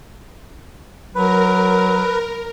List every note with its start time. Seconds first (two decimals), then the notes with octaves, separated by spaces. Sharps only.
1.15 F#3 A#4 B4